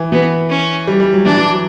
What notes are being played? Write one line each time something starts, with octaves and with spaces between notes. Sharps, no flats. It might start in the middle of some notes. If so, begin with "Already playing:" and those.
Already playing: E3
E3 B3
C#4
G3
G3
F#3
E3 D4
E3
F#3